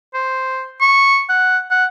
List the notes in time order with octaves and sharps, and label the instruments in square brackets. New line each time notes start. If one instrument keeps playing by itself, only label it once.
[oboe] C5
C#6
F#5
F#5